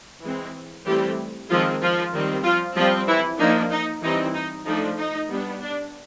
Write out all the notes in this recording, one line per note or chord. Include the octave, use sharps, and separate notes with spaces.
E3 G#3 C4
E3 G3 A3 C4 G4
D#3 F3 G#3 C4 F4
F3 F4
D#3 G3 C4
F3 F4
F3 G3 C4 F4
E3 E4
F3 A#3 D4 D#4
D#4
E3 G3 C4 D#4
D#4
F3 A3 D4 D#4
D#4
G3 B3 D4
D4